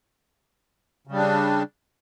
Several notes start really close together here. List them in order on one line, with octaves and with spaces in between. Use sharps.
C#3 G3 D4